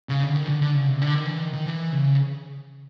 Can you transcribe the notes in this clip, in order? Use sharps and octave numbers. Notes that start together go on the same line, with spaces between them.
C#3
D3
D#3
D3
D3
C#3
C3
D3
D#3
E3
D#3
D#3
E3
C#3